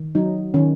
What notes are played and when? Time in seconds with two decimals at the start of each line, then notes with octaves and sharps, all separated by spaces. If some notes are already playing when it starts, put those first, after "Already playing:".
Already playing: D#3
0.15 F#3 D#4
0.54 D#3 C#4